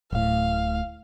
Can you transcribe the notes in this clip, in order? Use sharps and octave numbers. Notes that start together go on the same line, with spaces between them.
D1 A2 F5